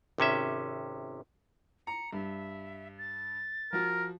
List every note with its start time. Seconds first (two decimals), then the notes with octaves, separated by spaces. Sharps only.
0.18 G#1 C3 C#4 E5
1.87 A#5 C#7
2.13 G2 E5
2.98 A6
3.73 F3 F#4 A#4